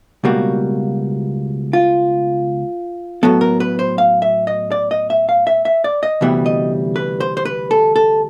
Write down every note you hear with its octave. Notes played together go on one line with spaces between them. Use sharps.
C#2 B2 G3 A#3 F#4
F4
A2 F#3 B3 A4
A#4
B4
C5
F5
E5
D#5
D5
D#5
E5
F5
E5
E5
D5
D#5
D2 C3 E3 G3 B3 E5
D#5
B4
C5
C5
B4
A4
A4